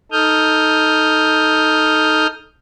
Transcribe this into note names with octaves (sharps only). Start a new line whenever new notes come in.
D#4 A4 D#6 F6 G6